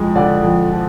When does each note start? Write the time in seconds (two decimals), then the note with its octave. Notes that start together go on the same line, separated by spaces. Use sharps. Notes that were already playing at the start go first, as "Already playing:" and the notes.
Already playing: F2 F3 G#3
0.15 D3 D5
0.43 F2
0.70 F3